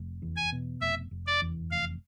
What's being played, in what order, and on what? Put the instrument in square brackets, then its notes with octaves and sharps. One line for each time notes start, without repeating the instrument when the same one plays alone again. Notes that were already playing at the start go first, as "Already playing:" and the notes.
Already playing: [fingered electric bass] F1
E2
[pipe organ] G#5
[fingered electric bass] B2
[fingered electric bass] F1 [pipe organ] E5
[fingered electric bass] F1
[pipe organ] D5
[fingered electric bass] E2
[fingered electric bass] F1 [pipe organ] F5